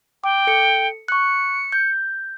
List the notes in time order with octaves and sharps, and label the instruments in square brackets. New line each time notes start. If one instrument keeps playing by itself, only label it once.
[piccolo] G5 [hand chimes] D6
[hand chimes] A4 C#7
[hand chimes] C#6 F#6 [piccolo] C#7
[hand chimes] G6